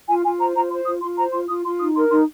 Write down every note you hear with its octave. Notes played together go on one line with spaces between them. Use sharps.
F4 G#5
F4 G#5
C5 A#5
F4 A#5
C5 C6
F4 D#6
F4 C6
C5 A#5
F4 C6
F4 D#6
F4 C6
D#4 D#6
A#4 C6
D#4 C6